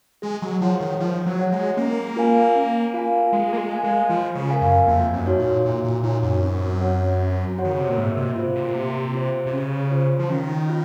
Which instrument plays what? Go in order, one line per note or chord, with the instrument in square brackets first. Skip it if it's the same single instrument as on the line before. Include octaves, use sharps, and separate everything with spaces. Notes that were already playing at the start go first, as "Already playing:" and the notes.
[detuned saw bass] G#3 [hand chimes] G#4
[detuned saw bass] F#3
[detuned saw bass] F3 [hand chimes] C#5 F#5
[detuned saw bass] D#3
[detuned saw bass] F3 [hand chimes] G#4
[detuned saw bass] F#3
[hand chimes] C#5 F#5
[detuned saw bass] G#3
[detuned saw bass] A#3 [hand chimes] C#4
[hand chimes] F4 A#4 F5 G#5
C#4
F4 A#4 F5 G#5
[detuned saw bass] G#3 [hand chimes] F4
[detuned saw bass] A#3
G#3
[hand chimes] A#4 F5 G#5
[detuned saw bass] G#3
[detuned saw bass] F3 [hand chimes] F4
[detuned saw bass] C#3
[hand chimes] A#4 F5 G#5
[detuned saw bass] F#2
[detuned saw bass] F2 [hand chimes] A#3
[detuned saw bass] F#2
[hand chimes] D#4 F#4 C#5
[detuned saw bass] A#2
[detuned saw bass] A#2 [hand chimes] A#3
[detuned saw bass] A#2
[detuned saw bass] A#2 [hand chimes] D#4 F#4 C#5
[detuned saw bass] F#2
[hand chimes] C4
F#4 C#5 F#5
C4
F#4 C#5 F#5
[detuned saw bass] D#3
C#3
C3
A#2
[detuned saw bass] G#2 [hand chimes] A#3
[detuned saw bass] C3
[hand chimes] F4 C5
[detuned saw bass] C3
A#2
[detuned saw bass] C3 [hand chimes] A#3
[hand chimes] F4 C5
[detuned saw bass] C3
[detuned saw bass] C#3 [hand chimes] C#4
[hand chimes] F4 C5
[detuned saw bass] F3
[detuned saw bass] D#3 [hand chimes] C#4
[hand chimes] F4